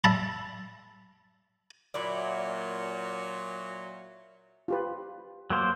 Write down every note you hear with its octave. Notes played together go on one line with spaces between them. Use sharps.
E5 A5 B5
A#2 F#3 E4 D5
F4 G4 B4
F#3 A#3 C5